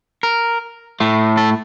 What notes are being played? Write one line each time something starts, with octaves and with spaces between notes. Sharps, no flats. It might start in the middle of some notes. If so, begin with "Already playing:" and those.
A#4
A2 A3
A4